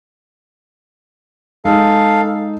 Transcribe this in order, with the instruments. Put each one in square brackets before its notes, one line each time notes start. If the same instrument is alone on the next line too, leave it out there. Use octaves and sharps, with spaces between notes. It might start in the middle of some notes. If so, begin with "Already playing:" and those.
[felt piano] G#3 D#4 [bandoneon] A4 F5